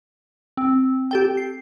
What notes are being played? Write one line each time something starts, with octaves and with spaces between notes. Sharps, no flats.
C4
G4 A4 G5
C7